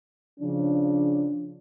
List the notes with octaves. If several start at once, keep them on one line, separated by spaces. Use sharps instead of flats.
C#3 F3 D4